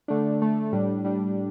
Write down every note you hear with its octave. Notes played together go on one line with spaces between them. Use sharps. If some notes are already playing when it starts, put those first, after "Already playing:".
D3 A3 D4
D3 A3 D4
A2 G3 D4
A2 G3 D4